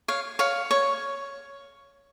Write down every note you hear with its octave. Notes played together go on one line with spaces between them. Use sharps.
C#5 F5
C#5 F5
C#5